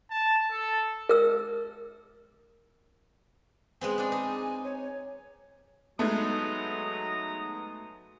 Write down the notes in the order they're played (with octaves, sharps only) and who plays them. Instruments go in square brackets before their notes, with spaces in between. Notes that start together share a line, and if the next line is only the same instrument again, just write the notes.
[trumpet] A5
A4
[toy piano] A#4 E6
[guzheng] G#3 B3 C4 [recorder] G#5
[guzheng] C4 D4
D#4
[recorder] C#5
[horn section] F#3 A#5 [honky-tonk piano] G#3 A3 [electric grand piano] B3 D#4 [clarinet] D#6